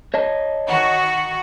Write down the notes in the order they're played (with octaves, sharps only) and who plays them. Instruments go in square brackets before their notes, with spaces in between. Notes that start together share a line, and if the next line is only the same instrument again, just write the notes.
[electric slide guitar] C#5 D#5 A5
[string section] D#3 F#4